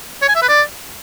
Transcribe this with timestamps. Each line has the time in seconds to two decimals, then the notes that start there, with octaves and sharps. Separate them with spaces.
0.22 C#5
0.29 G#5
0.35 E5
0.42 B4
0.49 D5